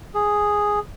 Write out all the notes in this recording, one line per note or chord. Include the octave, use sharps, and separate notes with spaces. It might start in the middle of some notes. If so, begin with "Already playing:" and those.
G#4